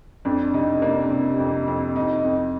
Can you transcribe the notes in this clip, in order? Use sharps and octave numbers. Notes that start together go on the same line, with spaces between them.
F2 D4
C3 D#4
A#3 D4
C3
F2
F2
F2 D#4
F2